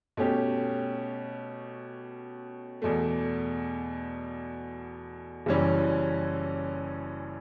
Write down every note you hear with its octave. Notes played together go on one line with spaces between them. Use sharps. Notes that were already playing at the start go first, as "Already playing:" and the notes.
B2 A3 C#4 G4
E2 B2 A3
F#1 F#2 E3 G3 C#4